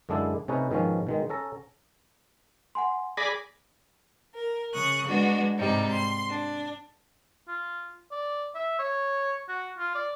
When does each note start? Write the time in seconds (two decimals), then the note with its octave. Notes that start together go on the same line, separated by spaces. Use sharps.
0.09 F#2 D3 G#3 D4 E4 A4
0.48 C3 A3 C#4 D#4 B4
0.71 G#2 B2 D#3 F3 C#4
1.07 B2 D#3 G#3
1.30 C#4 A4 A#5
2.75 F#5 G#5 C6
3.17 G#4 D5 B5 A#6
4.34 A#4
4.72 C#3 C#6 D#6 F#6
5.07 G#3 B3 D4 F#4
5.57 G#2 C3 G3 D#4
5.89 C6
6.28 D4
7.48 F4
8.11 D5
8.55 E5
8.79 C#5
9.49 F#4
9.79 F4
9.95 D5